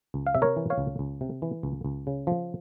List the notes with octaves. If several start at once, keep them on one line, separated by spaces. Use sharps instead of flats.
C#2
F5
C3 E5
A#4 C#5
E3
C#5 F5
C#2
C#2
C3
E3
C#2
C#2
C#3
F3